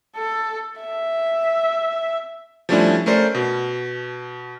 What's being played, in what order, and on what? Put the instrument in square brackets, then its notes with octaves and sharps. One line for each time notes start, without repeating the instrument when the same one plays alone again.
[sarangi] A4
E5
[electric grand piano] F3 G3 A3 C#4 D4 E4
A3 C#4 A#4 C5 D5
B2